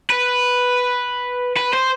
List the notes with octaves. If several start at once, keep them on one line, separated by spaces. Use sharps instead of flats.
B4
B4
C5